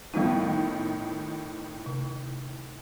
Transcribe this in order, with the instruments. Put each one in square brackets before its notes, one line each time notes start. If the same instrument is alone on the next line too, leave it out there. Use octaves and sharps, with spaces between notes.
[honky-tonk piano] F2 A2 D#3 [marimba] G3 B3 D#4
[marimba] C3